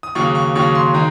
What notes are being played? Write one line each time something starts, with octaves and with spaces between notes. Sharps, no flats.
D#6
D#2 C#3 F#3 C#6
C#6
D#2 C#3 F#3 C#6
C6
D#3 G#3 A#5